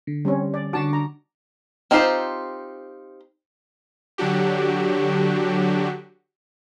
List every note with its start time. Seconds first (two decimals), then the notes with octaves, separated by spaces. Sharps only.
0.07 D3
0.25 G3 C4 C#4
0.54 D5
0.73 D3 D4 F#4 A5 D6
0.93 A#5
1.91 C4 D#4 F4 G4 C5
4.18 D3 F#3 D4 F#4 G4